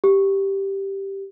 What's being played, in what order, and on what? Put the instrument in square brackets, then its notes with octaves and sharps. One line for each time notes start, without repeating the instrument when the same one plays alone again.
[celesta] G4